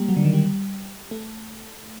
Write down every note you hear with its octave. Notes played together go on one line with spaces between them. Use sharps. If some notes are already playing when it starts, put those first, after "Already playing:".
Already playing: G3 A#3
F#3
D3
D#3
G3
A3